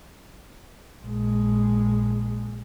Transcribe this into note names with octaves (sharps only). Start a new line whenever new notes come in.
A#1 G#3